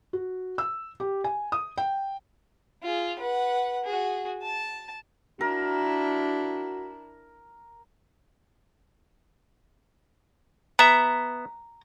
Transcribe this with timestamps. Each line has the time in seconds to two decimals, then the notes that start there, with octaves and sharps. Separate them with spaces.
0.13 F#4
0.58 E6
1.00 G4
1.24 G#5
1.52 D#6
1.78 G5
2.83 F4 G#4
3.19 B4 F#5
3.84 F#4 G#4
4.43 A5
5.41 D4 E4 F#4 A#4
10.79 B3 E5 A#5